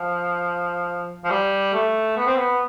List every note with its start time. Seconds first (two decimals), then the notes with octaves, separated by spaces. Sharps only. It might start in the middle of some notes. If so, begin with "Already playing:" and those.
Already playing: F3
1.24 F3
1.30 G3
1.73 A3
2.17 B3
2.27 C4
2.37 B3